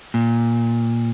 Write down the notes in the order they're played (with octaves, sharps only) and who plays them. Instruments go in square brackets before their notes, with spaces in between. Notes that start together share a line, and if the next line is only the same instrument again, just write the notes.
[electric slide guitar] A#2